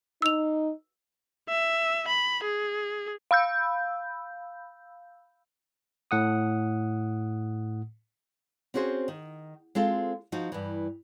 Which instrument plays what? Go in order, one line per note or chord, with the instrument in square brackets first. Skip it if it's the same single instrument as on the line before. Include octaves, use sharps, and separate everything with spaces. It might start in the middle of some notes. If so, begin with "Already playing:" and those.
[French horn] D#4 [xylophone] E6 F7
[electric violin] E5
B5
G#4
[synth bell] F5 B5 E6 G6
[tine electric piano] A2 F#5 D#6
[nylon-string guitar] C4 C#4 F#4 G#4 C5
D#3
G#3 C4 F4 A4
F3 D#4 F#4
G2 E3